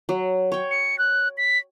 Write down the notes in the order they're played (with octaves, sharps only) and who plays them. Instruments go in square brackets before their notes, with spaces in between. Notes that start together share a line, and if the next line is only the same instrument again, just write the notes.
[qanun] F#3
C#5 G5
[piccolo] C#7
F#6
B6